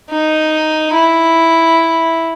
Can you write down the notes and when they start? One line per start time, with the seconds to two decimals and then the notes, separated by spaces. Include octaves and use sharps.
0.10 D#4
0.94 E4